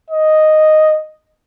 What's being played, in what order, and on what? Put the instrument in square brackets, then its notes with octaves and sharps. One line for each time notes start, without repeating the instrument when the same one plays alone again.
[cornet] D#5